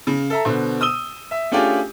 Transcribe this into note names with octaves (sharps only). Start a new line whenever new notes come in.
C#3
A4 E5 A#5
B2 D3 C5
D#6 E6 D#7 G7
E5
A3 C#4 D4 F4 G4 G#4